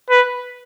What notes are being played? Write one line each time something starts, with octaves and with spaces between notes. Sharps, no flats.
B4